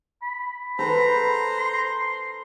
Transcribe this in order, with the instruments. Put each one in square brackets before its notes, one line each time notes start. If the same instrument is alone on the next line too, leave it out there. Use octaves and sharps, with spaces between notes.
[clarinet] B5
[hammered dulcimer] A4 B4 [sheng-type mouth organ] C5 A#5
[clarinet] C6